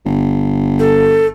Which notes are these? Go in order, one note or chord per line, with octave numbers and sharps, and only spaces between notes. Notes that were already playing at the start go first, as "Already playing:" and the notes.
G1
A4